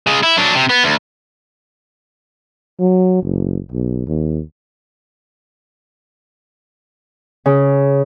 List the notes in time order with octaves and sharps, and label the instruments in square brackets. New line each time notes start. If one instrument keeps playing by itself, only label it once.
[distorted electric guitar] C#3 G#3
E4
F#3 D4
C3
B3
D2
[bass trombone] F#3
F#1
B1
D#2
[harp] C#3